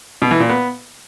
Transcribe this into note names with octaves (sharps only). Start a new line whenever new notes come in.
B2
E3
A#2
B3